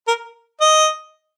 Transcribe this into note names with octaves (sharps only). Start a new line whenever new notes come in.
A#4
D#5